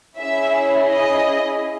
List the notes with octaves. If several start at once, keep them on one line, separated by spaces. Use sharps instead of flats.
C#4 E4 G#4 E5
D#5